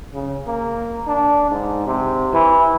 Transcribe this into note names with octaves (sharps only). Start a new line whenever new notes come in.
C#3
A#3
D4
G#2
C3
E3